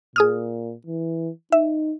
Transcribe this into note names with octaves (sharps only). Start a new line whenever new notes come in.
A#2 G#4 D#6 F6
E3
D#4 E5